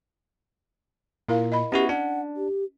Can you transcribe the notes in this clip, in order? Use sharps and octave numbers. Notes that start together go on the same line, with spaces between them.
A#2 E4 A#4 F5
D#5 B5
B3 C#4 E4 F#4 G4
D4 F#5
G4